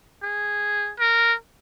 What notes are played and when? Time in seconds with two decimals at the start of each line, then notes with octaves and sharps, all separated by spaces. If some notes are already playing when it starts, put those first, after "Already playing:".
0.23 G#4
1.00 A#4